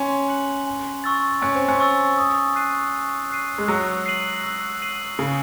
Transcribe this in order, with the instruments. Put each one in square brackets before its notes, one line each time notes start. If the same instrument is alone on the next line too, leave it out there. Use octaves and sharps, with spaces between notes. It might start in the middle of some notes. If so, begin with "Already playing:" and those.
Already playing: [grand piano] C#4 [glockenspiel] C6
[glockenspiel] F#6 C#7 F#7
G#5
C#6 E6 A6
[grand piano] C#4 [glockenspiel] G#5
[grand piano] C4
C#4
[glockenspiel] C#6 E6 A6
D#6
F#6 C7 D#7
D#6
F#6 C7 D#7
[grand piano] G#3
[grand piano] F#3 [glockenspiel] E6
[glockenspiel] C7 D#7 F#7
E6
C7 D#7 F#7
[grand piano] C#3 [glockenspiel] G#5